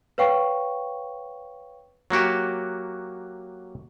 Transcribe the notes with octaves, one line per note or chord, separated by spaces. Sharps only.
B4 C#5 F5 G5 C#6
F#3 A#3 F#4 G4